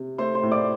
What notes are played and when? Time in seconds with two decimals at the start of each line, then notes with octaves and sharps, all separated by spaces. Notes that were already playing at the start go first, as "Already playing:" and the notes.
Already playing: C3
0.18 A3 C5 C6
0.35 C5 C6
0.43 A2
0.52 D5 D6